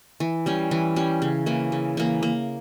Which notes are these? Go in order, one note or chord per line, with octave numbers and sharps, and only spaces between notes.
E3
G3 C#4
E3
G3 C#4
C#3
E3 A#3
C#3
E3 A#3
A#3